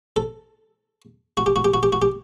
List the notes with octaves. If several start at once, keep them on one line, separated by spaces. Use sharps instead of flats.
A4
F#4
G4
F#4
G4
F#4
G4
F#4
G4